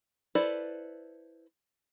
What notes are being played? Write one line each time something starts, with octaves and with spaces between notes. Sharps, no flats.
E4 A4 B4 C5 D5